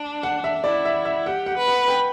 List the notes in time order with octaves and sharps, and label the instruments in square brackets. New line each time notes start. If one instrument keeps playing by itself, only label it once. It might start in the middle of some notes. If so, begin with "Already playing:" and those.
Already playing: [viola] D4
[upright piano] F#5
E5
[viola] E4 [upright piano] D5
[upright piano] E5
E5
[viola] G4 [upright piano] F#5
[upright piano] F#5
[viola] B4
[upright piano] F#5
G5